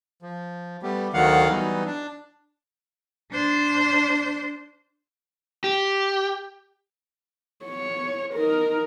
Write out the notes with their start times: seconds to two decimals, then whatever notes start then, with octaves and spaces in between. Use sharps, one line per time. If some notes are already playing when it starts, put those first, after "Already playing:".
0.22 F3
0.83 G3 A3 B3 G4
1.14 D2 D3 D#3 F#3 F5 F#5
1.50 E3 F#3 G3 B3 D#4
1.86 D4
3.32 D4 C5
5.64 G4
7.65 C#5
8.34 D#4 A#4